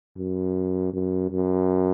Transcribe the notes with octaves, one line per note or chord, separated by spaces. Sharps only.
F#2
F#2
F#2